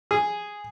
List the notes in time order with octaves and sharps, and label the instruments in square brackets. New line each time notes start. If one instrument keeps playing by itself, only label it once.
[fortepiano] G#4